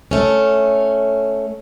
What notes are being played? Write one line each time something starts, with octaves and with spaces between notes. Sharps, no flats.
A3 C#4